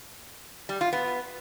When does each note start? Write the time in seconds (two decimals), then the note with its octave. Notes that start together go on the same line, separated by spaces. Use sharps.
0.69 G3
0.81 F4
0.93 B3